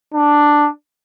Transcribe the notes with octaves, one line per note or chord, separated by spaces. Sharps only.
D4